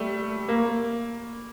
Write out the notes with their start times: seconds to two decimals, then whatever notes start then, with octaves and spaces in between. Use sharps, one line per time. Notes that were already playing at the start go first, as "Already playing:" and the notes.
Already playing: G3 A3
0.48 A#3